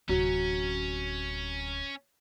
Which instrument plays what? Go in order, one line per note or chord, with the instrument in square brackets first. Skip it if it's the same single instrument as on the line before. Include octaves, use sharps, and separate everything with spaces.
[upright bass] D1 C3 [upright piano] F#3 [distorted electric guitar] C#4